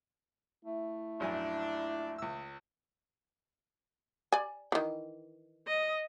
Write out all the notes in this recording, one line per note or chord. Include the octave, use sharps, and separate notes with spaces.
A3 E4
A#1 F#2 D4 G#5
C#2 E6
D5 G#5
D#3 E3
D#5